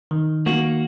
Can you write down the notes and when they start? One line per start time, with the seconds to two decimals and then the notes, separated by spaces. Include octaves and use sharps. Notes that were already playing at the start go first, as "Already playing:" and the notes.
0.11 D#3
0.46 A#3 F#4